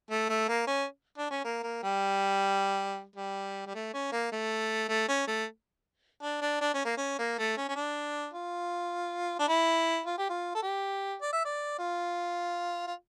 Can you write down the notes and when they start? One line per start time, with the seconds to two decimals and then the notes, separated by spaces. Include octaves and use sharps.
0.11 A3
0.29 A3
0.48 A#3
0.67 C#4
1.18 D4
1.31 C#4
1.44 A#3
1.63 A#3
1.83 G3
3.16 G3
3.66 G3
3.75 A3
3.94 C#4
4.12 A#3
4.32 A3
4.89 A3
5.09 C#4
5.27 A3
6.23 D4
6.42 D4
6.61 D4
6.74 C#4
6.85 A#3
6.97 C#4
7.19 A#3
7.38 A3
7.57 C#4
7.69 C#4
7.76 D4
8.34 F4
9.39 D4
9.48 E4
10.06 F4
10.18 G4
10.30 F4
10.55 A4
10.63 G4
11.21 D5
11.33 E5
11.45 D5
11.79 F4
12.87 F4